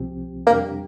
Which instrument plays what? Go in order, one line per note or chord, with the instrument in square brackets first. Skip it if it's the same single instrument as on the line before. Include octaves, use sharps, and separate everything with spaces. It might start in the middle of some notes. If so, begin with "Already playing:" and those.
Already playing: [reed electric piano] C2 C3 F3 C4 G4
[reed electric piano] F2 C3 G3 D4 G4 [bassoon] A#3